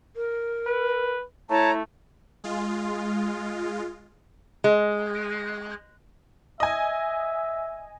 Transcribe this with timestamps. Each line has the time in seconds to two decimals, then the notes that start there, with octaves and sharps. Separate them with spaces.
0.16 A#4
0.67 B4
1.50 A3 E4 C#5 A5 A#5
2.44 G#3 F4
4.64 G#3
6.60 D#5 E5 G#5